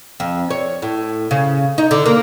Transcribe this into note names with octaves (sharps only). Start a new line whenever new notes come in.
F2
C#5
A2
C#3
D#4
D3
A#3